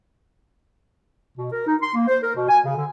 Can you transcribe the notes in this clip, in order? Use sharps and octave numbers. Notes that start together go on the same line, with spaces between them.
B2
A#4
D#4
C6
A#3
C5
A#4
B2
G#5
C#3
D3